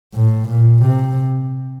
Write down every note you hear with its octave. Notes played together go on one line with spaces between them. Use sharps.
A2
A#2
C3